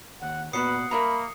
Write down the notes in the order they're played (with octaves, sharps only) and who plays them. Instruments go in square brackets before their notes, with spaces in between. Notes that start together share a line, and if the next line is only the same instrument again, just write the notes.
[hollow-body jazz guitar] D#2 [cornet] F#5
[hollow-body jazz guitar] A#2 B3 F#4 [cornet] B4 [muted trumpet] F#5 [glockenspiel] D#6 C7 C#7
[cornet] A#3 [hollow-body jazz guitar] A#4 E5 A#5 [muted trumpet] B5